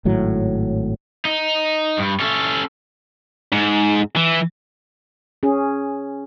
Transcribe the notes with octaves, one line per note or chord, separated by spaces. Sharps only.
G#1 A2 F#3
D#4
G2
C#4 A4
G#2
E3
C#4 G#4